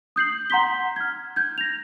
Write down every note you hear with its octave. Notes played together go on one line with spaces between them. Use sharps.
D#6 G6 C7 F#7
F#5 A#5 C6 G6 B6 G7
F6 G#6
G6 G#6
A#6 F7